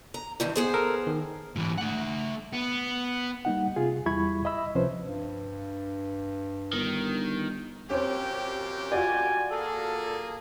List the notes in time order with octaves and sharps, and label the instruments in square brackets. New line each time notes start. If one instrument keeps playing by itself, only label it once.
[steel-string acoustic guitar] A#5
G2 D#3 E3
B3 G#4 C5
[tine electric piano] A4 A#4
D#3
[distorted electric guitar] G#2 E3
A3 F#5
B3
[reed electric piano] G3 A#3 D#4 F#5
C3 F4 G#4
E2 G3 E4 B5 C#6 G#6
D#5 E5 B5 E6
C#2 C3 F3 C#4 B4 C5
[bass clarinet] G2
[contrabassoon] G1 [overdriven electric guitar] D#3
[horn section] F#2 A#2 G4 [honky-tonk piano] C4 C#4
[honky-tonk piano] F4 F#4 D5 [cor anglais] G#5
[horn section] A#3 G#4 [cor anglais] A4